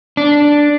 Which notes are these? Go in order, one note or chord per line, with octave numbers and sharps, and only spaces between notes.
D4